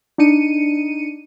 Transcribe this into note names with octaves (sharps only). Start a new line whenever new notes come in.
D4 D#4 C#7 D#7